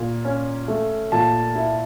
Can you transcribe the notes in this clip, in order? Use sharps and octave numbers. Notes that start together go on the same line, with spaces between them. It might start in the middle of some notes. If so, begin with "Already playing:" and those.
Already playing: A#2
C#4
A3
A#2 A5
E4